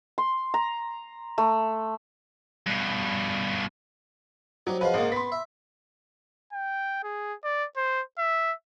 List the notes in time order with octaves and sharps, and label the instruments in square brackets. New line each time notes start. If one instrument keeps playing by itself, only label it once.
[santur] C6
A#5
A3
[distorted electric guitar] G2 B2
[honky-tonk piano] F#3 [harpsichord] G3 D#4 G4 [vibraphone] F#4 C5 C#5
[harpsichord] F3 F#4 C5 [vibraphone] G#4 D#5 F#5 [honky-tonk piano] B4 F5
[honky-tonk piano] G#1 [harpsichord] G#2 C#3 A#3
[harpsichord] B3 [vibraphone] B5 [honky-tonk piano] C6 B6
[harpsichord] E5
[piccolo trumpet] G5
G#4
D5
C5
E5